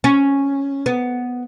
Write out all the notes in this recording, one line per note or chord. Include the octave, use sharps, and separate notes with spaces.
C#4
B3